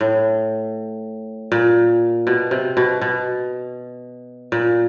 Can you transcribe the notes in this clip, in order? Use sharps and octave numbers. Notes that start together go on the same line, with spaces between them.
A2
A#2
B2
C3
B2
B2
A#2